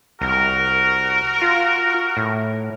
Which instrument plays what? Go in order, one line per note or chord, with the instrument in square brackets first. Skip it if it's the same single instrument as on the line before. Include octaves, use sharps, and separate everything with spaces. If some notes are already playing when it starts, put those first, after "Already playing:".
[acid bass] C2 [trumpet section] F#4 A#4
[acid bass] F4
A2